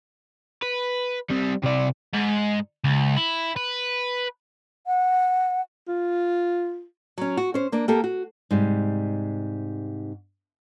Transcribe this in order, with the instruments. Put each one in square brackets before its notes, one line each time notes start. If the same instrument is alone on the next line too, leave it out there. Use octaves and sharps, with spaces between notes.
[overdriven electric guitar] B4
G3 C4
C3 D5
G#2
C#2
E4
B4
[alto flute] F#5
[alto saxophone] F4
[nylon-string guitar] F#3 C#4
F#4
C#4 C5
A#3 D4
A#3 G4 A4
F#4
G#2 C3 G3